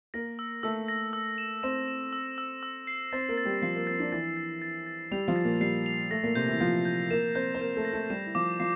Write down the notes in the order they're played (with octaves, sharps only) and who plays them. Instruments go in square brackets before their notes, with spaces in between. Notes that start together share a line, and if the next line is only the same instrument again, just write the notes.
[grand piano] A#3 A#4 [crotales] A#6
[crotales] E6
[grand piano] A3 A4 [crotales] E6
[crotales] A#6
E6
E7
[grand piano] C4 C5 [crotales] E7
[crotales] E7
E6
E6
E6
C7
[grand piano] C4 C5 [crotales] A6
[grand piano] A#3 A#4
[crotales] A6
[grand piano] G3 G4
[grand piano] F3 F4 [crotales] C7
[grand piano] A#3
[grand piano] C4 [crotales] A6
[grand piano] D4
[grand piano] E3 E4 [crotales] A6
[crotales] A6
A6
A6
[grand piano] G3 G4 [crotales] F7
[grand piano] F3 F4
[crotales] A6
[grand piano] A#2 A#3
[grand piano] G3 [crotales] C7
[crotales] F7
[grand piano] A3 [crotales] A#6
[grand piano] A#2 A#3
[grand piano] C3 C4 [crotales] G6
[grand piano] E3 E4
[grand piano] F3 F4 [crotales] G6
[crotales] G6
[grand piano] A#3 A#4 [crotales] E7
[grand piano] C4 C5 [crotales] G6
[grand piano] C5
[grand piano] A#3 A#4 [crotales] E7
[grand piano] A3 A4
[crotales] A#6
[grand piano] A3 A4
[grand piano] G3 G4 [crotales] E7
[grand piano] E4
[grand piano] F3 F4 [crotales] D6
[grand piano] F3 F4 [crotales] C7